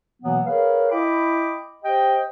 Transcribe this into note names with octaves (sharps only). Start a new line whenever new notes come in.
B2 E3 F#3 A#3 B3
G#4 A#4 B4 C#5 F5
E4 D#5 G5 B5 D6
G4 C5 D#5 G5